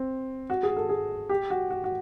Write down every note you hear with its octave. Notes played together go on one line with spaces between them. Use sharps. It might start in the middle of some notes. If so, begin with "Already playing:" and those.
Already playing: C4
F#4
G#4
A4
G#4
G4
F#4
F#4
F#4